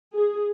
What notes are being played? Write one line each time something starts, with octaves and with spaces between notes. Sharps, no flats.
G#4